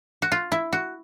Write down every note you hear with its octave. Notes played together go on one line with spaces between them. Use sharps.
F#4
F4
E4
F#4